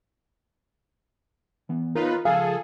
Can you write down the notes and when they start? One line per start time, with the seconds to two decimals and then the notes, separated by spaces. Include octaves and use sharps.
1.69 E3 B3
1.95 B3 D#4 F4 A#4 B4 C#5 A#5
2.25 C#2 F3 G#4 A4 F5 G#5